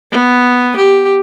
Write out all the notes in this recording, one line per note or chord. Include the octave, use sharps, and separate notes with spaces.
B3
G4